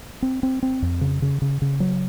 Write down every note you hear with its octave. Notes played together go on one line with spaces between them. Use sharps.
C4
C4
C4
F2
C#3
C#3
C#3
C#3
F#3